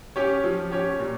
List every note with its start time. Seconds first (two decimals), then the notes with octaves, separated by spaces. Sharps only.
0.16 C#4 G4 C#5
0.44 F3
0.72 C#4 G4 C#5
0.99 A#2